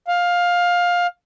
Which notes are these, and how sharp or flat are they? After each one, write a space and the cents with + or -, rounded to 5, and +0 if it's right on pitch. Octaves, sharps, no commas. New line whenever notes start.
F5 +15